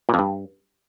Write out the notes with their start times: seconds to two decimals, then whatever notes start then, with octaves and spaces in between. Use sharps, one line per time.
0.09 A#2
0.14 F2
0.19 G2